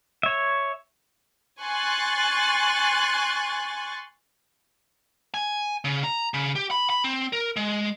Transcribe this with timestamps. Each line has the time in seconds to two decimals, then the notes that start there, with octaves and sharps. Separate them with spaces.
0.23 C#5 E5
1.60 G#5 C6 C#6 F#6 A6
5.34 G#5
5.84 C#3
6.04 A#5
6.34 C#3
6.56 G4
6.71 B5
6.90 B5
7.04 C4
7.33 A#4
7.56 G#3